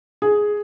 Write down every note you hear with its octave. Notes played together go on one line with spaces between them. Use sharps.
G#4